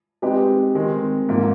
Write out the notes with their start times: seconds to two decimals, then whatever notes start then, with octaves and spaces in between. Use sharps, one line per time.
0.22 G#3 C4 D#4 G4 B4
0.75 D#3 G#3 C4
1.29 G#2 F3 A#3